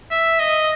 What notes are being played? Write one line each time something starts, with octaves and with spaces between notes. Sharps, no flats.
E5
D#5